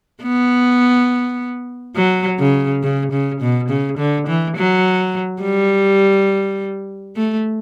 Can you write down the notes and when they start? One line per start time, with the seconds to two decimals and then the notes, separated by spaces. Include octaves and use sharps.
0.23 B3
1.96 F#3
2.40 C#3
2.83 C#3
3.12 C#3
3.41 B2
3.69 C#3
3.98 D3
4.28 E3
4.57 F#3
5.42 G3
7.16 A3